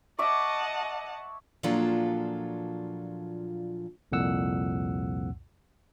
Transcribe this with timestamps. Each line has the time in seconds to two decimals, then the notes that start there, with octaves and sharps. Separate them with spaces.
0.19 C#5 D#5 E5 F#5 A5 D6
1.63 A#2 F3 F#3 D4 F4 A4
4.12 C2 F2 A#2 F#5 E6